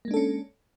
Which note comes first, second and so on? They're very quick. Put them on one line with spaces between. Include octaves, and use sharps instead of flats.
A#3 G#3 D4 A4 C#4